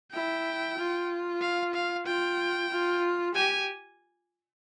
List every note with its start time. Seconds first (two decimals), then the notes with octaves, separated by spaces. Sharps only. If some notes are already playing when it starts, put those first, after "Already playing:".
0.13 E4 G5
0.77 F4
1.41 F5
1.74 F5
2.06 F4 G5
2.70 F4
3.34 G4 G#5